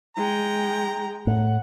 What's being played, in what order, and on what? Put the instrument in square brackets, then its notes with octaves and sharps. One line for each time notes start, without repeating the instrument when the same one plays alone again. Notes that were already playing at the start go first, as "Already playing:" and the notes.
[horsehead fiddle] G#3 G5 [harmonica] A#5
[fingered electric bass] A2 [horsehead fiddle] F#5